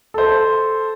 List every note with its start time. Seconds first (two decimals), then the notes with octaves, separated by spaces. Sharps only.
0.14 A4 C5